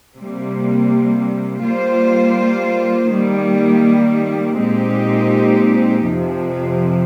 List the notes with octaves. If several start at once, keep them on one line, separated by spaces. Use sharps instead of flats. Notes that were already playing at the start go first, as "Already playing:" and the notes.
C3 G3 A#3
G3 A#3 F4 C5
D#3 G3 A#3
A#2 G#3 C4 D#4 G4
F2 C3 F3